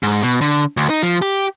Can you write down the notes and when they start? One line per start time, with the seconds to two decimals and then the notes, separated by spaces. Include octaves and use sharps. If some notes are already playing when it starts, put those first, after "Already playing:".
0.03 G#2
0.22 B2
0.41 D3
0.77 D2
0.90 D#4
1.02 F3
1.22 G4